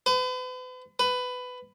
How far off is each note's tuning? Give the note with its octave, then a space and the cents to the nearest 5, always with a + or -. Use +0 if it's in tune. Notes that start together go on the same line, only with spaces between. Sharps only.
B4 +40
B4 +15